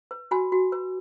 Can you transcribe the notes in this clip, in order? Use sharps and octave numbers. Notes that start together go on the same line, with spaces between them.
B4
F#4 G#5 B5
F#4
B4